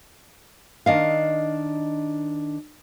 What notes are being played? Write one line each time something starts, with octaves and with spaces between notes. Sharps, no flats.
D#3 D4 D#5 F5